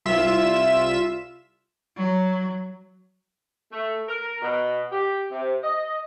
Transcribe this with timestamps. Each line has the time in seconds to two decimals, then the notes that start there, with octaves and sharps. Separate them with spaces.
0.05 C2 F4 E5 E7
1.97 F#3
3.72 A3
4.09 A#4
4.42 B2
4.92 G4
5.31 C3
5.64 D#5